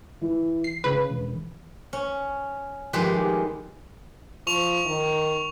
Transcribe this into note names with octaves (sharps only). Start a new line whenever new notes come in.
E3
C7
C#3 B4
E1
C#4
D#3 F3 G#3 A3 G4 B4
F3 C#6 F7
D#3